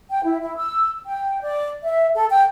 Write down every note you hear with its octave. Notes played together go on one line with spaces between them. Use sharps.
G5
E4
E4
E6
G5
D5
E5
A4
G5